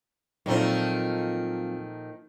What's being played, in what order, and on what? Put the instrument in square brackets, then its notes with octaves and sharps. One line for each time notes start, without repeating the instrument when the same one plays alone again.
[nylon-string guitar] A#2 F3 D#4 [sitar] D#3 A3 [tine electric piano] F#3 C4 F4